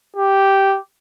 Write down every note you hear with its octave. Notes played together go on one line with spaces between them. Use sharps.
G4